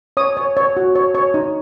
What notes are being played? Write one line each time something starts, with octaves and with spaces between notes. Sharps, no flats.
C#5 D#6
C#5
C#5
F#4
C#5
C#5
D#4